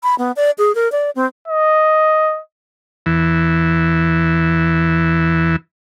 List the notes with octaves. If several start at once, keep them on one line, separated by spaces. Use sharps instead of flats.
B5
B3
D5
G#4
A#4
D5
C4
D#5
E2 E3